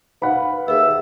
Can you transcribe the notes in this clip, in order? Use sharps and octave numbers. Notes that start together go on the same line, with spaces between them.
D#4 B4 F5 F#5 B5
D#2 G#4 A#4 B4 E5